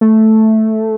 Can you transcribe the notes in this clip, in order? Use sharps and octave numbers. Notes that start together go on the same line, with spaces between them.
A3